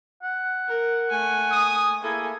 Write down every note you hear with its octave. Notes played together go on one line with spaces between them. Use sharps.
F#5
A#4
A3 G#5
D#6
A#3 E4 G#4 A4 G#5